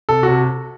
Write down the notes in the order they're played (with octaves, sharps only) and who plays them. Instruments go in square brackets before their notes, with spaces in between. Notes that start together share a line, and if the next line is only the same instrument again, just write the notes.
[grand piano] C3 A4
F#4
C3